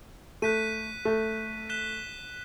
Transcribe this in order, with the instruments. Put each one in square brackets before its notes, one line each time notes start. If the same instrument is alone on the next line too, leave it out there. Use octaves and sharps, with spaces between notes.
[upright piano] A3 [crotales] F#6 B6 D#7
[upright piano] A3
[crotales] F#6 B6 E7 G7